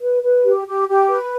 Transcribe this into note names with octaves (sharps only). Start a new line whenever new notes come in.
B4
B4
G4
G4
G4
B4